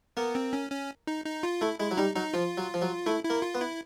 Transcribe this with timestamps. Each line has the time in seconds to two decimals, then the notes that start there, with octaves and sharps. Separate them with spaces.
0.17 A#3 B3
0.35 C4
0.53 C#4
0.71 C#4
1.07 D#4
1.25 D#4
1.43 F4
1.61 A3 E4
1.79 G#3 E4
1.91 F#3
1.97 G3 D#4
2.16 F#3 D#4
2.34 F3 F4
2.58 F#3
2.74 F3
2.82 F#3
3.06 A3 E4
3.24 E4
3.30 A#3
3.42 F4
3.55 B3
3.61 E4